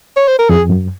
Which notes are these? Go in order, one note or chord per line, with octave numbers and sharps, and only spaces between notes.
C#5
C5
A#4
F2 G#4
F#2